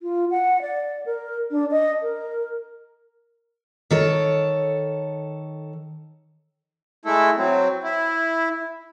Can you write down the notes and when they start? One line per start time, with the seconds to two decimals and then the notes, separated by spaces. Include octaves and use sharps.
0.02 F4
0.31 F#5
0.62 D5
1.06 A#4
1.51 D4
1.71 D#5
2.02 A#4
3.91 D#3 A4 C#5
7.05 G#3 A3 E4 A4
7.37 F#3 C4
7.84 E4